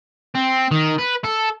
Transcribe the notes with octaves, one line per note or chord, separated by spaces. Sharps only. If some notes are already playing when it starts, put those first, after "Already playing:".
C4
D#3
B4
A4